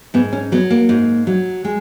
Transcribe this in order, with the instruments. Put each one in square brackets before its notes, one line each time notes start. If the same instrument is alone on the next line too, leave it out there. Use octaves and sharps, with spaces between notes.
[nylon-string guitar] G#2 B3
C#4
F#3 B3
A#3
G#2
F#3
G#3